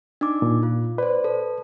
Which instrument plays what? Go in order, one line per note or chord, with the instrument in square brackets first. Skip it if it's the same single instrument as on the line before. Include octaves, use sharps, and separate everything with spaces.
[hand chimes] D4 D#4 D6
[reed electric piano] A#2
[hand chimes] F4
[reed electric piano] B4 [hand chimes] C5 D5
[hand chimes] A4